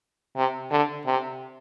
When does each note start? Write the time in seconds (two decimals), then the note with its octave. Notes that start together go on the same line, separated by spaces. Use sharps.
0.36 C3
0.71 D3
1.06 C3